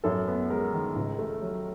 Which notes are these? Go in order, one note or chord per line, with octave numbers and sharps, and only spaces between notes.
F#2 A4
B3
G#3 A#4
D#3
C#2
A3
F#3